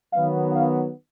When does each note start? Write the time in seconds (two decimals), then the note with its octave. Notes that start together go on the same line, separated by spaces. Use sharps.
0.13 D#3 F#3 B3 F5
0.53 F5